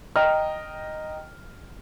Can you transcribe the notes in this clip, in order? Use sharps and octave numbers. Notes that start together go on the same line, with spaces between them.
D#5 G5 A#5 F6